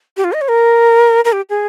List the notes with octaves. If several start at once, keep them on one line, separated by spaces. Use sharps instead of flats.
G4
F4
D#5
C#5
A#4
A#4
G4
G#4